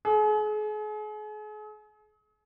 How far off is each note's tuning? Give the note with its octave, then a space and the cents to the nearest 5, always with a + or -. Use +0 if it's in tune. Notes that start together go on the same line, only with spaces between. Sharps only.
G#4 +40